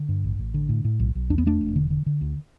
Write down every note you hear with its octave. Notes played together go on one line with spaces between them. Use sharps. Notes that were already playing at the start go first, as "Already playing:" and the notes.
Already playing: D3
G2
A1
A1
D3
A2
A2
B1
B1
E2 D4
B3
E1 A3 D4
E1
D3
D3
D3
D2